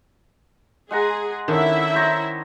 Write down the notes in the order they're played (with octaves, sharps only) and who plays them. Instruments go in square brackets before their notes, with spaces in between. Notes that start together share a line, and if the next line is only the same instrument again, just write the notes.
[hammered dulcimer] G#3 F#5 A#5 [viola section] G#4
[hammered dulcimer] D3 [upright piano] D#3 C#4 [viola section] E4 E5
[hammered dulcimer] C5 C#5 A#5